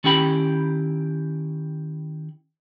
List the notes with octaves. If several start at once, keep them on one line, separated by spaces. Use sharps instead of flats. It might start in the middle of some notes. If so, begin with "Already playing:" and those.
D#3 C#4 E4 G4 G5 B5